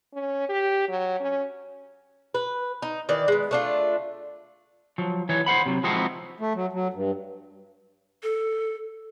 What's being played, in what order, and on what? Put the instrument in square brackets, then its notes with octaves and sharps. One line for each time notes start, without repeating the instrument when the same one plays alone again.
[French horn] C#4
G4
F#3
C#4
[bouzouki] B4
D#4
D#3 E3 D5
G#3 B3
A3 D4 F4
[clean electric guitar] F3 F#3
E3 C#5
C5 F#5 B5
C3 F#3
F3 G#3 C4 D#4 E4 F#4
[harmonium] A3
F#3
F#3
G2
[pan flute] A4